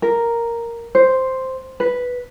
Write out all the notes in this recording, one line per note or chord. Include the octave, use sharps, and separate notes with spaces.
A#4
C5
B4